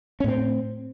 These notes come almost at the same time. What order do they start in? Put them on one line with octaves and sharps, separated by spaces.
C#4 A2 C4